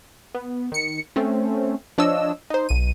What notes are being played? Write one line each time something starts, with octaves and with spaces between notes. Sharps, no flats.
B3
D#3 C#7
A3 C4 C#4
F3 D4 C#5 D#5 E6
D#4 C5
B1 D#7